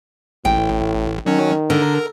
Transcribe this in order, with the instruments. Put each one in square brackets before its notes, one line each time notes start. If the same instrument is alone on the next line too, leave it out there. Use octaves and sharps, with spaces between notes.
[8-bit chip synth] A1 [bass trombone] A2 [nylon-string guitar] G5
[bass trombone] D#3 [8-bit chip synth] F#3 C#4
[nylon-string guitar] D3 [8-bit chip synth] A#4